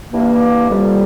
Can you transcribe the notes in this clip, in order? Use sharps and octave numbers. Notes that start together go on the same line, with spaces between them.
G2 E3 A#3
F2 C3 G3